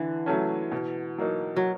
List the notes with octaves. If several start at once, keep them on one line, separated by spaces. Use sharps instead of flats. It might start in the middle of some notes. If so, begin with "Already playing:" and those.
Already playing: D3 E3
F#3 A3 C#4
B2
F#3 A#3 D#4
F#3